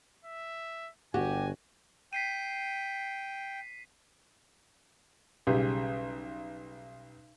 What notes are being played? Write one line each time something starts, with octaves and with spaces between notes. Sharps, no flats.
E5
G1 F#4 G4 G#5
G5 B6 C7 D#7
B1 C#3 G3 G4 G#4 E5